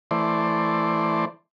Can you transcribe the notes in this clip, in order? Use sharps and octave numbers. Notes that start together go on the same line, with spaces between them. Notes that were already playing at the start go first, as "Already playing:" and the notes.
E3 A3 C5 D5